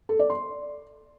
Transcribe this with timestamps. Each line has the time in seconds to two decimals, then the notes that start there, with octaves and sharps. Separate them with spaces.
0.09 A4
0.19 D5
0.30 C6